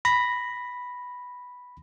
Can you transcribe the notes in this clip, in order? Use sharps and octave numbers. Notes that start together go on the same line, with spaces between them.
B5 A#6